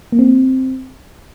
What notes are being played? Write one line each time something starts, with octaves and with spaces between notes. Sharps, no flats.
A#3
C4